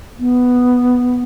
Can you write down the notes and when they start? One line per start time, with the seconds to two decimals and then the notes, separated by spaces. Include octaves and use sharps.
0.19 B3